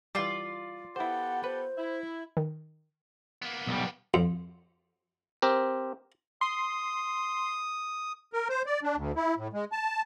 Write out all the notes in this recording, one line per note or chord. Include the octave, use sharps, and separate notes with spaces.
E3 G3 F4 D5
B3 E4 G4 A4 C5 F#5
B4 C5
E4
D#3
A#3 B3
B1 G3
F2
C4 G4 A#4
C6 D#6
A#4
C5
D5
D4
D2
E4
A2
G#3
A5